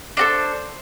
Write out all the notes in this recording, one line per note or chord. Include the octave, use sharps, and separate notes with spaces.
D4 F#4 A4 C5